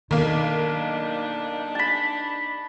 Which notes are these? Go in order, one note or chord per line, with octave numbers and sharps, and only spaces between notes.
B1 D#3 A#3 D4 D#4
A5 B5